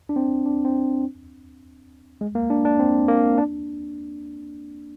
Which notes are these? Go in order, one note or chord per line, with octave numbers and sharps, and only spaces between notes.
D4
C4
D4
C4
G#3
A#3
D4
D4
C4
A#3
D4